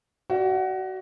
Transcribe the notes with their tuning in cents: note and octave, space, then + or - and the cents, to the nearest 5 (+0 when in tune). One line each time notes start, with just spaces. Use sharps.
F#4 +25 D5 +5 F5 -25